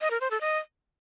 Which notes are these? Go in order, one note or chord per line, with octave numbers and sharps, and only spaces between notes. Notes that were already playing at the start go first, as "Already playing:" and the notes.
D#5
A#4
C5
A4
D#5